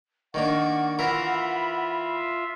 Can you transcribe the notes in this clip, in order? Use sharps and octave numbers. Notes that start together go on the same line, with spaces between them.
D#3 A#3 D4 F#5 C#6
E3 F4 A#4 E5 B5